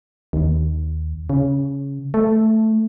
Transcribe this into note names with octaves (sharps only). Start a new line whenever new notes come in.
D#2
C#3
A3